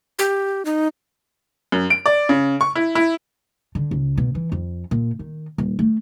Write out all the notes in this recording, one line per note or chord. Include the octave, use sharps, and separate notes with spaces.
G4
D#4
F#2
D7
D5
C#3
C#6
E4
E4
D3
C#2
B2
E3
F2
A#2
D#3
D#1
A3